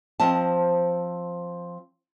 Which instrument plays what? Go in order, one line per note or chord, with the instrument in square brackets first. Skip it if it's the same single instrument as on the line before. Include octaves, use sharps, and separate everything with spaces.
[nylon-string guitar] F3 C4 C5 D#5 A5